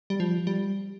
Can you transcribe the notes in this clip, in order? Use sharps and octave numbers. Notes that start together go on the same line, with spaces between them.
G3
F3
G3